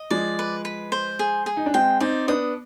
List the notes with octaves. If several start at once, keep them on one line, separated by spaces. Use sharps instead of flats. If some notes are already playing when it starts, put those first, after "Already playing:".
Already playing: D#5
F3 G#3 D5
B4
B4
C5
G#4
G#4
D#4
D4
G#3 C4 G5
C4 D#4 D5
B3 D4 D#6